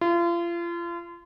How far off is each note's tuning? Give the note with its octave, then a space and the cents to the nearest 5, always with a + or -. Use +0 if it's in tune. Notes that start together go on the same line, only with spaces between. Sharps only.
F4 -35